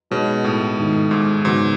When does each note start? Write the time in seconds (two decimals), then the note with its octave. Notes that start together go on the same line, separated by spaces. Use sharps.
0.11 B2 G#3 B3 D#4 G#4 C#5
0.44 A2
0.78 G#2 D#3 G#3 D#4 A4
1.11 G#2
1.45 G#2 C#3 F#3 B3 D#4 F#4